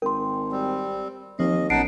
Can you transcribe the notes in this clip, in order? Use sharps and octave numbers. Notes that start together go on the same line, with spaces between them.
G#1 A#4 G5 C6
G3 C4
D#2 F3 C4 D#5
A1 F#2 B3 D#4 F#5 A5 C7 D7